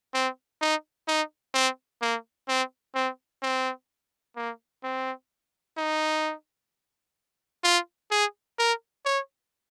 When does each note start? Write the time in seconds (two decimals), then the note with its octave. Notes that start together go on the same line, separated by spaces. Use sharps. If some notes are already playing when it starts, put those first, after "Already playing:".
0.14 C4
0.61 D#4
1.08 D#4
1.54 C4
2.02 A#3
2.48 C4
2.95 C4
3.43 C4
4.36 A#3
4.84 C4
5.77 D#4
7.64 F4
8.11 G#4
8.59 A#4
9.05 C#5